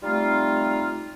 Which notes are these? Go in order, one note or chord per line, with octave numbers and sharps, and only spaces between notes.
G3 A3 C4 D#4 F4